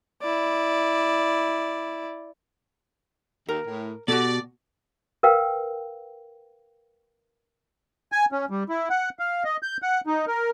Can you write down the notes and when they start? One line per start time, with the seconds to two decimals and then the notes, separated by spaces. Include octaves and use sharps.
0.21 E4 D5
3.49 D#2 A#4
3.67 A2
4.08 B2 F#4 G4 A4 D5
5.23 A#4 B4 F5 G5
8.12 G#5
8.32 C#4
8.50 G3
8.69 E4
8.90 F#5
9.19 F5
9.44 D#5
9.63 G6
9.82 F#5
10.07 D#4
10.27 A#4